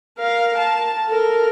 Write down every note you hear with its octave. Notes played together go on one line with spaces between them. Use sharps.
A#4 F5
A5
A4 A#4